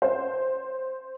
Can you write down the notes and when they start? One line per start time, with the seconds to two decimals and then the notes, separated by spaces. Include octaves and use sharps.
0.02 C5